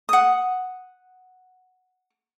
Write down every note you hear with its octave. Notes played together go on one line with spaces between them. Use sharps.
F#5 D#6